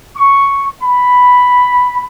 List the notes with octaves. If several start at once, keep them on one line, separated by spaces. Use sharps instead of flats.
C#6
B5